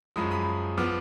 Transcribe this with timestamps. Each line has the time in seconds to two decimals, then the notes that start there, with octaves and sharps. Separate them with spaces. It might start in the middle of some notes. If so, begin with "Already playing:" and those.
0.16 F#2 F3 G#3 B5 D#6
0.31 B5 D#6
0.77 F3 B3 D6 F6